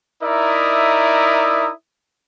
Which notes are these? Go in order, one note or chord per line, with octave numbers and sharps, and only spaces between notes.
D#4 E4 A#4 D5 E5 D#6